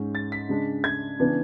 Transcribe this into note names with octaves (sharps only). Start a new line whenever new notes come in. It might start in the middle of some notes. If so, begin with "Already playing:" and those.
Already playing: G#2 G#3 C#4
A6
B6
C#3 G#3 D4
G#6
C#3 E3 B3 D4